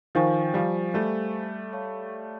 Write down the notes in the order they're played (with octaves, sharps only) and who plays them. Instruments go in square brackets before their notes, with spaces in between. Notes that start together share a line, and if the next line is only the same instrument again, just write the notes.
[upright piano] D#3 F3 [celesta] C5 F5 G#5 C#6
[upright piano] F3 G3
G3 A3
[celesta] C#5 F5 A5 C#6